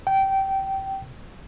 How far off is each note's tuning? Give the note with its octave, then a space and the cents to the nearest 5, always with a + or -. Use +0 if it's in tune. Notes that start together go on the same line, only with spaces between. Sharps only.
G5 -20